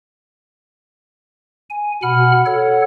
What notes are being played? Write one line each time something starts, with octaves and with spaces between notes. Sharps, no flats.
G#5
B2 F#5 B5 F6
A4 C#5 F#5